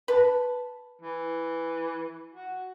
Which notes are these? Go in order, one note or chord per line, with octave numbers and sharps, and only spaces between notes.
B4 A5
E3
F#4